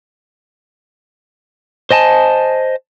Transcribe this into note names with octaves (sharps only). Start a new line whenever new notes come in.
C5 D#5 G#5 A5